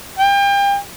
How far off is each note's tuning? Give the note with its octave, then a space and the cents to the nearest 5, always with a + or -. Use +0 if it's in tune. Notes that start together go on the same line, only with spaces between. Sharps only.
G5 +35